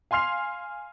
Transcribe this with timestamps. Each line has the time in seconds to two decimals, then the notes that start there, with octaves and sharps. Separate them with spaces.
0.11 F5 G#5 C6 F6 C7 F7